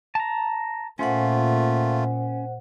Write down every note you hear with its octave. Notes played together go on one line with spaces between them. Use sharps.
A5 A#5
A#2 A3 C#4 F4 C5 F#5